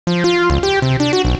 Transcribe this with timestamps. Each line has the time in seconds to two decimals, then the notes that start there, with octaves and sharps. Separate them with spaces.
0.07 F3
0.24 F4
0.50 C#2
0.63 G4
0.82 C3
1.00 D4
1.13 F#4
1.25 B1